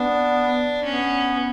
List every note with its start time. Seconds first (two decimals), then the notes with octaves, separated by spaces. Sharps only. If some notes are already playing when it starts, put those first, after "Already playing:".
Already playing: B3 D4
0.85 B3 C#4